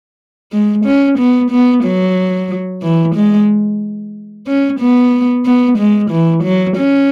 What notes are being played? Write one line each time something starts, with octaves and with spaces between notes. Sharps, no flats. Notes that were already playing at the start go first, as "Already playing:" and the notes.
G#3
C#4
B3
B3
F#3
E3
G#3
C#4
B3
B3
G#3
E3
F#3
C#4